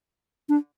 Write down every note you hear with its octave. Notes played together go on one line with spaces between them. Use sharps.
D4